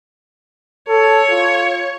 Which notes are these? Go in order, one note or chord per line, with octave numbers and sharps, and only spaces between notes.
A4 C#5
F4